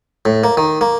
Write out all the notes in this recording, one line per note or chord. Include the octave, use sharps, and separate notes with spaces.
A2
A#3
D#3
A#3